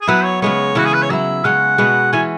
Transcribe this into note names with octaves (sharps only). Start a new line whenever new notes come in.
G#4
F#3 B3 E4 B4
C#5
C#3 G#3 B3 C#5
C#3 E3 C#4 E4 F#4
G#4
B4
C#5
F#3 E4 E5
C#3 G#3 C#4 F#5
B2 G#3 B3 F#4
E3 C#4 G#5